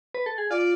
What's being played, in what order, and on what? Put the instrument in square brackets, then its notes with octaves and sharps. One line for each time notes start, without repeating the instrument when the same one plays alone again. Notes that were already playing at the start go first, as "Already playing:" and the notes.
[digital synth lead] B4
A4
G#4
[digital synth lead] F4 [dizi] D5